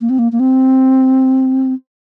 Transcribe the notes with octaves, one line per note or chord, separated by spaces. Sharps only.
A#3
C4
A#3
A#3
C4